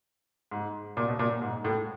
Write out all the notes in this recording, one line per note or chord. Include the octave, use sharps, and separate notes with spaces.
G#2
A#2
B2
A#2
G#2
A2